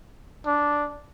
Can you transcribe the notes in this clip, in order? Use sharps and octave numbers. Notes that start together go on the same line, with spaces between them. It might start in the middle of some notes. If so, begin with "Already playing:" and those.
D4